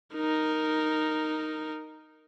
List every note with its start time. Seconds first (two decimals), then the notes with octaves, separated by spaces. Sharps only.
0.15 D#4 A#4